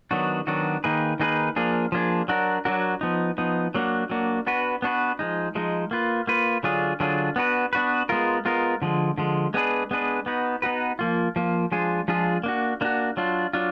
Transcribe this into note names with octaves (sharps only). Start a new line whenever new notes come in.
D#3 F#3 B3 D4 F#4
D#3 F#3 B3 D4 F#4
D#3 A#3 D#4 G#4 B4
D#3 A#3 D#4 G#4 B4
F3 A#3 D4 G#4
F3 A#3 D4 G#4
F#3 D4 F#4 A#4
F#3 D4 F#4 A#4
F3 B3 D#4
F3 B3 D#4
F#3 A#3 D4 F#4
F#3 A#3 D4 F#4
B3 D4 F#4 B4
B3 D4 F#4 B4
F3 G#3 D#4
F3 G#3 D#4
A#3 F4 B4
A#3 F4 B4
D3 F#3 D4 F4 G#4
D3 F#3 D4 F4 G#4
B3 D4 F#4 B4
B3 D4 F#4 B4
G#3 B3 F4 A#4
G#3 B3 F4 A#4
D3 F3 G#3
D3 F3 G#3
G#3 B3 D4 G#4 B4
G#3 B3 D4 G#4 B4
B3 D#4 F#4 B4
B3 D#4 F#4 B4
F3 A#3 F4
F3 A#3 F4
F3 G#3 D4 F4 G#4
F3 G#3 D4 F4 G#4
A#3 D4 F#4
A#3 D4 F#4
F#3 D4 F4
F#3 D4 F4